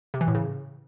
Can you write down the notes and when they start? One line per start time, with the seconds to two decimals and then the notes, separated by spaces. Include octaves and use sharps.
0.14 C3
0.21 E3
0.28 A2
0.35 C#3